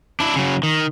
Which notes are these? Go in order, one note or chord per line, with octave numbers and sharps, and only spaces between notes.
D4 E4
C#3 F#3
D#3